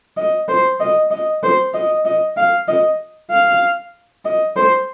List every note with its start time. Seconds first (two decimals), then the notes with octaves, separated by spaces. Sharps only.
0.17 D#5
0.49 C5
0.80 D#5
1.11 D#5
1.43 C5
1.74 D#5
2.05 D#5
2.37 F5
2.68 D#5
3.31 F5
4.25 D#5
4.57 C5